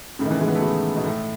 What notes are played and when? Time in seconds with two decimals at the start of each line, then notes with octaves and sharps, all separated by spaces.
0.19 A2 C#3
0.25 D#3
0.30 C#3 E3
0.40 E3 G#3
0.48 B3
0.55 A3
0.62 E3 G#3
0.96 B2
1.05 A2